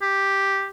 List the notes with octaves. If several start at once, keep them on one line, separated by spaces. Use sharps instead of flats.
G4